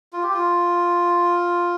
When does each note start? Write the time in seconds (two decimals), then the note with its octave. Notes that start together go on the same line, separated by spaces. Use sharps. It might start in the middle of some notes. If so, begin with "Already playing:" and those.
0.13 F4
0.23 G4
0.34 F4